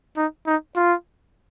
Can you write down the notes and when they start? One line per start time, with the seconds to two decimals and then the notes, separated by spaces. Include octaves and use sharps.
0.17 D#4
0.47 D#4
0.76 F4